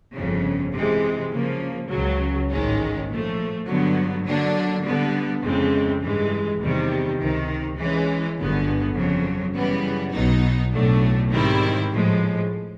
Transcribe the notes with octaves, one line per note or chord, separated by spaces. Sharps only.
G1 F2 C#3
C3 E3 G#3
C#3 F3 A#3
C#2 C#3 F#3
A1 G#2 D#3 G#3 C#4
A#2 F3 A3
G2 D3 F#3 B3
D3 F#3 A#3 D4
D3 G3 B3
F2 C#3 E3 G#3 C4
G2 E3 G#3
E2 C3 D#3 G3
C#2 C3 D#3
E3 G#3 C#4
G1 G2 D3 F#3 B3
F2 C#3 F#3
F#2 C#3 E3 G3 B3
B1 B2 F#3 B3 D#4
B1 A2 F#3 A3 D4
G#2 D#3 G3 C4 E4
A2 F3 G#3